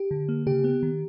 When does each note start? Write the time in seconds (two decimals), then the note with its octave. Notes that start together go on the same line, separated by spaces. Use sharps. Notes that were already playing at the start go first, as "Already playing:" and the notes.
Already playing: G4
0.11 D3
0.29 A#3
0.47 C#3 G4
0.64 B3
0.83 D#3